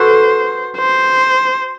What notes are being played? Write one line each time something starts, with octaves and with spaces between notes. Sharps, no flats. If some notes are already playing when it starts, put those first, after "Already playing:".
Already playing: F#4 A4 B4 C5
C5